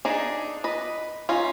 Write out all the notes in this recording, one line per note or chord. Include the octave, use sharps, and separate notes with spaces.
D4 D#4 G#4
B4 D#5
C#4 D#4 F4